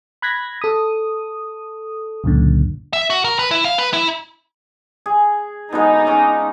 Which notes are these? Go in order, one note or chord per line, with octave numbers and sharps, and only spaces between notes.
B5 F#6 G#6 A#6 B6
A4 D#6
C#2 F#2 A#2 D3
E5
F#4
A#4
B4
E4
F5
B4
E4
G#4
B2 D3 G#3 D#4
C#4 F4 D6